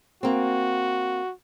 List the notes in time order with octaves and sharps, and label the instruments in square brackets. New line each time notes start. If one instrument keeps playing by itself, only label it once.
[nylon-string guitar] A#3 C4 [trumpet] F#4